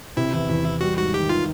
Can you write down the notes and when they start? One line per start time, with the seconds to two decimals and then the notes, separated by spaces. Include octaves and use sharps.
0.17 C3 E4
0.33 E2
0.49 E2
0.65 E2
0.81 G3 F#4
0.98 G#2 F#4
1.14 D#3 G4
1.29 D#3 F4